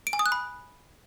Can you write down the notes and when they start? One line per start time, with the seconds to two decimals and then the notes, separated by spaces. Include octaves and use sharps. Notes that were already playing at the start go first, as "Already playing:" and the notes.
0.07 D7
0.13 G#5
0.19 D#6
0.26 F#6
0.32 B5